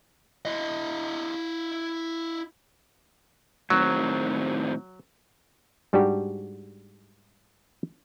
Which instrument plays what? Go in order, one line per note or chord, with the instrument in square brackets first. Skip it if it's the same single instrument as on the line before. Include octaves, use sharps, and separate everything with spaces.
[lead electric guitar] E4 D#5
[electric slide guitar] A2 D#3 C4 [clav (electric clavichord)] F#3
[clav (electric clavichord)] G#2 G3 D4 F#4 G4